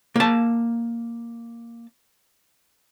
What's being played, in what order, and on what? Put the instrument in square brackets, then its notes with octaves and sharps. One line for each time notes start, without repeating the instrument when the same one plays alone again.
[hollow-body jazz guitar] A#3 A5